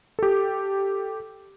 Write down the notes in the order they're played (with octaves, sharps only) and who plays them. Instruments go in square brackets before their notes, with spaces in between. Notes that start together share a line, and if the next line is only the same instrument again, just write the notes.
[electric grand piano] G4 A4